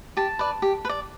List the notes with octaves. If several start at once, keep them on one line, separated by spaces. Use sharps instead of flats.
G4 A5
B4 D5
G4
B4
D5